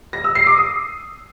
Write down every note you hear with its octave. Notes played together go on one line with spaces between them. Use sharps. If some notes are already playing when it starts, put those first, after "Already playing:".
A#6
E6
C7
D6
D#6